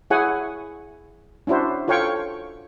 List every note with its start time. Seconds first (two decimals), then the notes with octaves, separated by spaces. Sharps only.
0.10 E4 G#4 C#5 F#5 G#5
1.47 C#4 D4 E4 F#4 C5
1.88 F4 A4 C#5 F5 G5 C#6